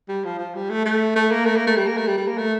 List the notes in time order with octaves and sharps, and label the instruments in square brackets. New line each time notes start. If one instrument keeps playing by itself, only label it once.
[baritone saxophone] G3
F3
F3
G3
A3
A3
A3
A#3
A3
A#3
A3
G3
A#3
A3
G3
G3
A#3
A3